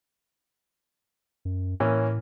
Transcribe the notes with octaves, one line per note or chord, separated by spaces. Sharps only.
F#2
A2 E3 A#3 C#4